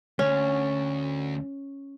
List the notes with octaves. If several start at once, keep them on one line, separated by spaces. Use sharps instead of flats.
D2 C#4